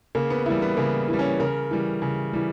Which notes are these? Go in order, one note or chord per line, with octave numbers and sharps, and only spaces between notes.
C#3 A#3
B3
E3 G3 E4
B3
C#3 A#3
E3 G3
C#4
C#3 A#4
E3 G3
C#3
E3 G3